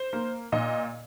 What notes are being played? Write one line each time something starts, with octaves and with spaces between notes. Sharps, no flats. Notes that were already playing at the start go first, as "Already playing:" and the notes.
Already playing: C5
A#3
A#2 D#5